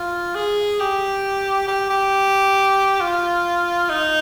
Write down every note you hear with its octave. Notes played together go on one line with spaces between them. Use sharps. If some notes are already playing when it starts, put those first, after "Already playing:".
Already playing: F4
G#4
G4
G4
G4
F4
D#4